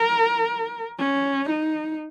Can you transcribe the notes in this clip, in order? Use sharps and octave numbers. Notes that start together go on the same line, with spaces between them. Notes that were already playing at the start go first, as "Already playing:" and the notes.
Already playing: A#4
C#4
D#4